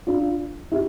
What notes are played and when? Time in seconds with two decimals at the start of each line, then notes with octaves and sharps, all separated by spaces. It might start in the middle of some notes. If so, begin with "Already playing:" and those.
0.07 D4 F4
0.72 E4 G4